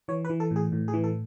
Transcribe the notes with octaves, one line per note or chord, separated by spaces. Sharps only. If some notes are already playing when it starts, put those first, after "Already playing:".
E3 C#5
B4
E3
A4
A2 G#4
A2
G#4
E3
A4